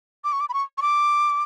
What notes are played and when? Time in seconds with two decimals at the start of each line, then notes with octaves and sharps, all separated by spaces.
0.24 D6
0.33 C#6
0.40 D6
0.49 B5
0.54 C#6
0.78 C#6
0.82 D6